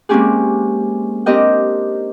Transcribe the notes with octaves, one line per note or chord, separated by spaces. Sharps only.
G#3 A#3 C4 C#4 G4 G#4
C4 D4 G4 A#4 D#5 G5